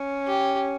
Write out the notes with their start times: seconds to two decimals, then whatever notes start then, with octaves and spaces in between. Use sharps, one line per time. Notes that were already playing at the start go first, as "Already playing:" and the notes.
Already playing: C#4
0.27 G4